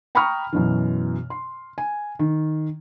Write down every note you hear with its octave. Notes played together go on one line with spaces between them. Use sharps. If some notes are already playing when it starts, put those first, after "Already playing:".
G5 A#5 B5 C#6 D#6 F6
F#2 B2 E3
C6
G#5
D#3